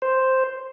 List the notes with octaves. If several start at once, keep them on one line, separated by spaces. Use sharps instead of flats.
C5